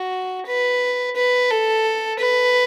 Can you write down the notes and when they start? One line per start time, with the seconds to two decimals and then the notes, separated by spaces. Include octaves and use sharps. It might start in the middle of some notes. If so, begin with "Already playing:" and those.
Already playing: F#4
0.47 B4
1.16 B4
1.51 A4
2.19 B4